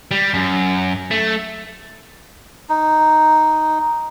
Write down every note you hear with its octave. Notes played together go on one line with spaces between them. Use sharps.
G3
F#2
A3
D#4